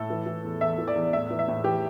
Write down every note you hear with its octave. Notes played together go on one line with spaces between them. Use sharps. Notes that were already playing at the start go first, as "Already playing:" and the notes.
Already playing: A2 A4
E3
E3
E2
E2 E5
E3
D5
E2
A2 E5
E3
E5
A2
E3 G4